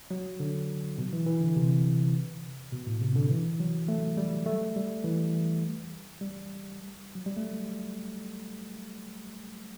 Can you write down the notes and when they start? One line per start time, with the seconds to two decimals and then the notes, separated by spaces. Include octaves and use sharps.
0.11 F#3
0.40 D3
0.98 B2
1.13 E3
1.26 E3
1.41 D3
1.56 C3
2.72 B2
2.87 A2
3.01 C3
3.16 D3
3.30 E3
3.60 F#3
3.88 A3
4.17 G3
4.46 A3
4.76 G3
5.04 E3
6.21 G3
7.15 F#3
7.26 G3
7.37 A3